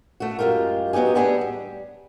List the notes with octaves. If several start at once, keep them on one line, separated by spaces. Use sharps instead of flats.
A3 F#4
F#2 G#3 F4 G4 A#4
F#3 B3 D#4 G4 G#4
E2 A2 B3 D4 G4 G#4
G3